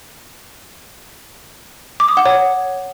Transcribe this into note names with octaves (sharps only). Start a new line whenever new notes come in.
D6
D#6
F#5
C#5